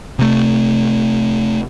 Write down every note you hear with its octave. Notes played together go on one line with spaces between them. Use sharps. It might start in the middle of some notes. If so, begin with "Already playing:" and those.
C3 A3